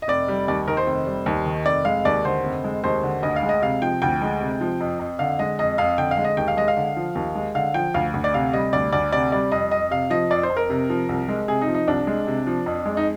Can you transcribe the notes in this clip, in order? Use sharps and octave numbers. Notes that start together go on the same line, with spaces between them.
D#5
F1 D5
G3
D#2 D5
D#3 A#4
C5
F1
G3
D#2
D#3
F1 D5
G#3 F5
D#2 D5
D3 C5
F1
G#3
D#2 C5
D3
D2 D#5
F5
G#3
D#5
C3 F5
F3 G5
D2 G5
G#3
C3
F3
F2
F2
D3 F5
G#3 D#5
F2 D#5
F2 F5
D3 G5
F5
G#3
D#5
D#2 G5
F5
G#3 D#5
F5
D3
F3
D#2
G#3
D3 F5
F3 G5
D2 F5
D2
D5
C3 F5
G3 D#5
D2 D5
D2 D5
C3 D5
G3 D5
F2 D#5
F2 D#5
C3 F5
F3 D#5
F2 D5
C5
F2
A#4
C3
F3
C2
G#3
C3 G#4
D#4
F3
D#4
C2 D4
G#3
C3
F3
F2
G#3
D#4